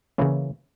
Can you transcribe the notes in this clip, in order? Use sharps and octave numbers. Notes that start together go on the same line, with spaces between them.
C#3 E3 A#3 C#4 E4